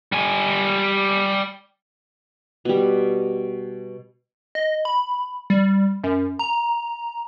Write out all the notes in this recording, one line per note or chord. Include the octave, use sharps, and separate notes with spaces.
G3 G#5
B2 G3
D#5
B5
G3
F#2
A#5